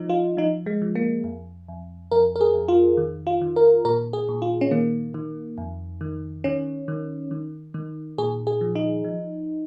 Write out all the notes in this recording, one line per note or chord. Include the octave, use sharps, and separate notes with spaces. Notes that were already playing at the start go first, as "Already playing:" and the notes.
Already playing: F3 D#4
F4
F3 D#4
G#3
F3
A#3
F2
F2
F2 A#4
A#4
G#4
F2
F4
D#3
F4
D#3
A#4
A#2 A#4
G#4
A#2
F4
C#4
D#3 A#3
D#3
F2
D#3
D#3 C#4
D#3
D#3
D#3
A#2 G#4
G#4
F3
D#4
F3